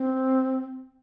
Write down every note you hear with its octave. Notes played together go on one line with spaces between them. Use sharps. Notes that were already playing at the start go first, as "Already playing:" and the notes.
Already playing: C4